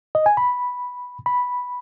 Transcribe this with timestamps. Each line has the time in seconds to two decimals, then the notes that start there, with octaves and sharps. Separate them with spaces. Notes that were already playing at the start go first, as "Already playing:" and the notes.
0.15 D#5
0.26 G#5
0.37 B5
1.26 B5